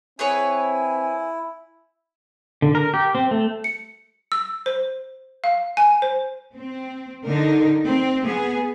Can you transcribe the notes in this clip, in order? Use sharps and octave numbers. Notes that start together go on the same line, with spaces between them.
C4 E4 G#4 B4 C#5 G#5
D3
A#4
G4
C4
A3
C#7
E6
C5
F5
G#5
C5
C4
D3 D#4 A#4
C4
B3 G#4